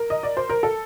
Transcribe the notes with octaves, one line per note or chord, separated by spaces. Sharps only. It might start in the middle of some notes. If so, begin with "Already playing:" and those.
Already playing: A#4
D#5
D5
C5
A#4
A4